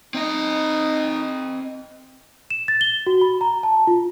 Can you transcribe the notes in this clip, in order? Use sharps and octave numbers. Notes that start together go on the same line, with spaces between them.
C4 D#4 D#5
E7
A6
G7
F#4
B5
A#5
A5
F4